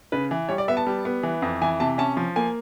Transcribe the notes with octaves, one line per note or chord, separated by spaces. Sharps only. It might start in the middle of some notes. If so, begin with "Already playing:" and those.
C#3 B4
E3
G3 C#5
D5
B3 E5
A5
G3
B3
E3
F2
E3 G#5
C3 A5
C#4 A5
F3
A#3 G#5